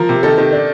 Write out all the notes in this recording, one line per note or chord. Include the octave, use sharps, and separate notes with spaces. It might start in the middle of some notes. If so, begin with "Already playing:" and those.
Already playing: F3 A#4
C3
D#3 A4
D#3
D4